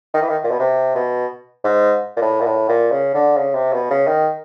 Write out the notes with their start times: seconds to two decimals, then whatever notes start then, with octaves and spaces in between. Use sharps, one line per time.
0.14 D#3
0.22 E3
0.29 D#3
0.44 A#2
0.51 B2
0.59 C3
0.95 B2
1.64 G#2
2.16 A#2
2.21 A2
2.40 A#2
2.45 A2
2.69 A#2
2.91 C#3
3.14 D3
3.37 C#3
3.54 C3
3.73 B2
3.90 C#3
4.07 D#3